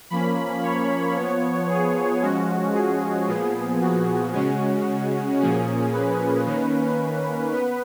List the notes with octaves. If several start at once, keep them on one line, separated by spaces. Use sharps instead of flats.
F3 A#3 C#4 B5
C#5
F3 B3
G#4
F3 G#3 C#4 F#4
G#4
A#2 F3 B3 G#4
F#4
C#3 G#3 C#4
A#2 F3 A#3 C#4 G#4
B4
D#3 A#3 C#4
B3 B4